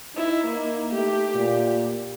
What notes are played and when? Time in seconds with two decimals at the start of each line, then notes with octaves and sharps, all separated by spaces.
0.16 D#4 E4
0.47 A#3
0.93 A3 G4
1.35 A#2